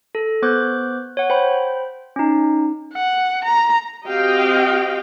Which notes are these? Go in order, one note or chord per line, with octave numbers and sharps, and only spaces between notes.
A4
B3 C5 D6 F#6 G6
C#5 F#5
C5 G5 B5
C#4 D#4
F#5
A#5
C4 F#4 G4 D#5 F5 G5